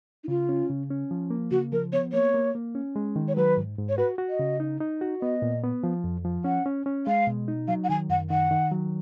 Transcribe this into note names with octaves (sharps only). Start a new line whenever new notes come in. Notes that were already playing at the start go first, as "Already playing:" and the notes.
D#4
C#3 F4
C#4
C#3
C#4
F3
A#3
C#3 F#4
F3 A#4
B3 C#5
A#3 C#5
A#3
A#3
C#4
G#3
D#3
C#5
F#3 B4
G#2
G#2
C#5
F#4 B4
F#4
D#5
C#3
D#4
D#4
F#4
B3 D#5
A#2
B3
F3
F2
F3
C#4 F#5
C#4
C#4
G#3 F5
B2
D#4
F#3 F5
F#5
D#3 G#5
F#2 F#5
D#3 F#5
D#3
F#3